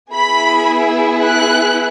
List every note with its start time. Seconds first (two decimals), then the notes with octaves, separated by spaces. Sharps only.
0.14 B3 E4 G#4 B5
1.24 F#6